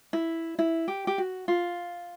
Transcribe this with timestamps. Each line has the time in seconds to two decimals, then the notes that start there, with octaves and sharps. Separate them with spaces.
0.13 E4
0.59 E4
0.88 G4
1.07 G4
1.18 F#4
1.48 F4